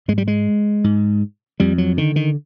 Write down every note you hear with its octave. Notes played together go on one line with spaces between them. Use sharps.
G#2 G#3
G3
G#3
G#2
F2 G3
F#3
D3 D#3
D#3